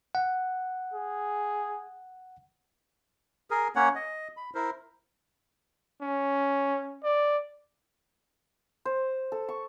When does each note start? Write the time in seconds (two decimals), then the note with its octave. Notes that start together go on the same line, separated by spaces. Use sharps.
0.15 F#5
0.94 G#4
3.51 G#4 A#4
3.76 A#3 C#4 C#5 F#5
3.95 D#5
4.37 B5
4.55 E4 A#4 C5
6.02 C#4
7.03 D5
8.85 C5
9.32 A4
9.49 C#6